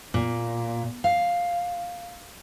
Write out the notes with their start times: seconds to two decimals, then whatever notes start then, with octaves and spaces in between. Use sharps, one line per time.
0.14 A#2
1.04 F5